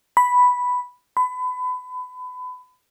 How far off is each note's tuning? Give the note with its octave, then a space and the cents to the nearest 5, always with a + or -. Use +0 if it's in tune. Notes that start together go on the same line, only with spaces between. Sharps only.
B5 +0
B5 +30